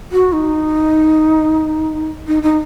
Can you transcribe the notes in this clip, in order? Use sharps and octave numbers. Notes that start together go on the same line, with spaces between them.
F#4
D#4
D#4
D#4